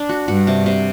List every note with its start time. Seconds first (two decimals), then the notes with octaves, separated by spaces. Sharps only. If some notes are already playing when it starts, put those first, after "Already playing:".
Already playing: D4
0.09 F#4
0.28 G2 F#4
0.47 C3
0.66 C3